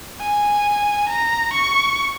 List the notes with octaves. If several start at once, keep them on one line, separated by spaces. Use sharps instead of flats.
G#5
A#5
C#6